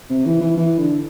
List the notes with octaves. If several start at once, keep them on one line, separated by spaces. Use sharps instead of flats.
C3
E3
E3
E3
D3